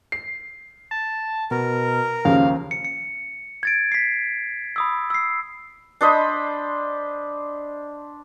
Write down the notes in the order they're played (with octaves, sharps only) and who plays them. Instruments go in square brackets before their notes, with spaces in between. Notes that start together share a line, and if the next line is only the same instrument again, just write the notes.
[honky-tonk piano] C7
[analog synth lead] A5
[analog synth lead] B2 [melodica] A#4
[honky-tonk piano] D#2 C#3 F3 [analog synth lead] F5
[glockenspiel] C#7
C#7
G#6 A6 D7
B6 C7
B5 D#6 E6
E6 C7
[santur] D4 C5 D#5 B5